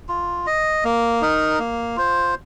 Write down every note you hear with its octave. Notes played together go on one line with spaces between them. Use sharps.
F4
D#5
A#3
D#4 A#4
A#3
F4 C5